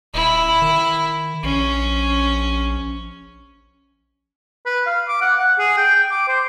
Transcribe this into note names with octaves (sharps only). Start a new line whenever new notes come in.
D#1 E4
D#3
A#1 C#4
B4
F5
D6
F#5
F#5
G#4
G5
G5
D6
C5